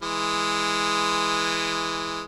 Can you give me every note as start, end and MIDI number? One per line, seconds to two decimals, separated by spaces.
0.02 2.23 52
0.02 2.23 56